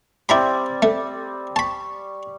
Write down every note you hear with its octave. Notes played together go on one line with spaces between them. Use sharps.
G3 C4 E4 D5 A#5 B5
A3
A5 B5 C#6